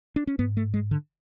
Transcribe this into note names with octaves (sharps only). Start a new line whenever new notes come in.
D4
C#4
G#2 B3
A3
G#3
D3